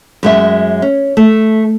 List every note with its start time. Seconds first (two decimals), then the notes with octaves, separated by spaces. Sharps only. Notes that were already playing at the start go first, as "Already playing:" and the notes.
0.23 F#2 G#3 E5
0.82 C#4
1.17 A3